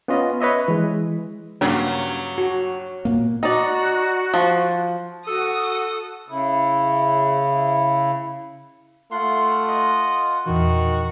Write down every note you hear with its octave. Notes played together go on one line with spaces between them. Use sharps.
B3 C#4 F4 D#5
B4 C#5 D#5 E5
E3 G#3
G2 C#3 F#3 A#3
F#4
A#2 A#3
D#4 F#4 D5
F3
F#4 A4 D#6
C#3 E4
A3 F4 F#5 C6
D#5
E2 A#2 D#3 E3 F#4